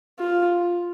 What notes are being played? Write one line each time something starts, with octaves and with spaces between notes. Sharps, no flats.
F4